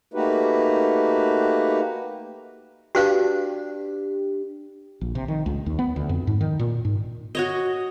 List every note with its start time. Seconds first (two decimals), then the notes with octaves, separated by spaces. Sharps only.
0.14 A3 A#3 D#4 F#4 G4 B4
2.95 D4 F#4 G4 B4 F5
5.01 A#1
5.15 C3
5.28 D#3
5.46 C#2
5.66 D#2
5.79 B3
5.96 D2
6.09 F2
6.27 G#2
6.41 D#3
6.59 A#2
6.85 G#2
7.35 F#4 C#5 D#5